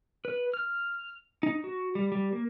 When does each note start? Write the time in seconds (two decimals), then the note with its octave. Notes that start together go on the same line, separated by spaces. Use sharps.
0.25 B4
0.54 F6
1.43 D#4
1.64 F#4
1.95 G3
2.12 G3
2.32 A#3